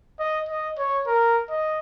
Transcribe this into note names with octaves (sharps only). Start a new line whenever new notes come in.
D#5
D#5
C#5
A#4
D#5